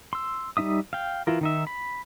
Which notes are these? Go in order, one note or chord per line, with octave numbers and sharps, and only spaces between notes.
C6 E6
G3 C4 D#4 E5 D#6
F5 G5
E3 E4 F4 A#4
D#3 D#4 E5
B5